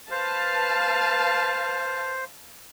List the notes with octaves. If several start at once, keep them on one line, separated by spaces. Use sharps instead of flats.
B4 C5 F5 A5